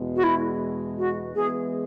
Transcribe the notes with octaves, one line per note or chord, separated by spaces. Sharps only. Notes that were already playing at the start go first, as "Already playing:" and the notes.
Already playing: E2 B2 G#3
F#4
E4
F#4
E3 G#3 B3 G#4